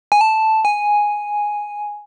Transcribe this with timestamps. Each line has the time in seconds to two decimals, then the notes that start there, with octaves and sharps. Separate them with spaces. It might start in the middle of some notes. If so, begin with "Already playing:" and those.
0.12 G#5
0.21 A5
0.65 G#5